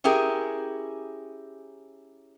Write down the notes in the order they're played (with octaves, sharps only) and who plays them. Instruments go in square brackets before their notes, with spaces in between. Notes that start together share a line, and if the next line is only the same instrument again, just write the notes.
[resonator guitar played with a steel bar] C#4 E4 G4 G#4 A#4